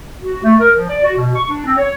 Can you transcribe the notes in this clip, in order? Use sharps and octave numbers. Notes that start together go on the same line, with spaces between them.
F#4
A3
A#4
F3
D5
F#4
B2
C#6
D4
C4
C#5